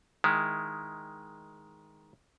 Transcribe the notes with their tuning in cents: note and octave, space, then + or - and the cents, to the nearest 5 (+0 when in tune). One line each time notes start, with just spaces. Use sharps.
D#3 +5 G#3 +0 E4 +0